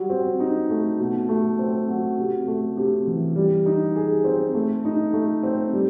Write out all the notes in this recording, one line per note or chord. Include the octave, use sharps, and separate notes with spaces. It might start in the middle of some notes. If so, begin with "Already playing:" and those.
Already playing: F#3 G3
C4
D#4
A3
B2
A3
C4
F#3
C3
A3
C3
E3
G3
D#4
G#4
C4
A3
D#4
A3
C4
G3